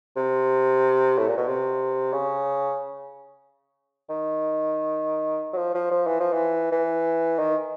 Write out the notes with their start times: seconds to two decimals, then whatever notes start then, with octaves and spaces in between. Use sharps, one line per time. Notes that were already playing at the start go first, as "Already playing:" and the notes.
0.16 C3
1.18 A2
1.28 A#2
1.37 B2
1.48 C3
2.13 C#3
4.10 D#3
5.53 F#3
5.57 F3
5.74 F3
5.91 F3
6.07 E3
6.20 F3
6.33 E3
6.72 E3
7.38 D#3